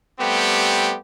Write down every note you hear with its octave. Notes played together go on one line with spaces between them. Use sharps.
G3 A3 B3 C4 G4